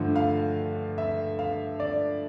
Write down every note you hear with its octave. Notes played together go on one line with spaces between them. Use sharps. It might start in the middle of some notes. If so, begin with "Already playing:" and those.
Already playing: G2 D3 F3 A3
F5
E5
F5
D5